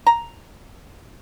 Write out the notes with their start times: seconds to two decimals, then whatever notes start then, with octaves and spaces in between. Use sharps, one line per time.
0.06 A#5